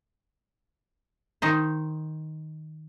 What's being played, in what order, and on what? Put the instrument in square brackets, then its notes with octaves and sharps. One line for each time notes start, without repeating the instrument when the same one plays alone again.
[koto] D#3 D#4 C5